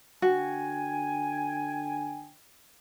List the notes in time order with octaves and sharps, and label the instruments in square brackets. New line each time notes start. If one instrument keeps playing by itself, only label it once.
[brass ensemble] D3 G5 G#5 [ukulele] F#4